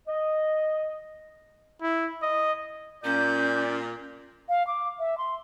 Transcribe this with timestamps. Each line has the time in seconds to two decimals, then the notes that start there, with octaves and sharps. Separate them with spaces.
0.08 D#5
1.82 E4
2.22 D#5
3.04 A#2 C#4 D5 G6
4.49 F5
4.67 D6
4.99 E5
5.18 C6